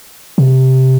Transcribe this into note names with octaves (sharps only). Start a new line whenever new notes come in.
C3